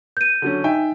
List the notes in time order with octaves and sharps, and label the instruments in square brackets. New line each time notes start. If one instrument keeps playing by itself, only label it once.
[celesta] G6 D#7
[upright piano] D3 F#3 C#4
[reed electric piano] D#4 [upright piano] E5 G5 G#5